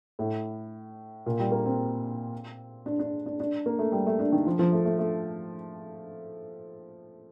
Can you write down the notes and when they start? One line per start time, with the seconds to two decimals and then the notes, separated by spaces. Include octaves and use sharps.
0.19 A2
1.26 A#2
1.39 G3
1.52 A#3
1.65 C4
2.86 D4
2.99 D4
3.26 D4
3.40 D4
3.66 A#3
3.79 A3
3.92 G3
4.07 A3
4.19 D4
4.32 D#3
4.46 F3
4.59 F3
4.72 A3
4.86 A3
4.99 A3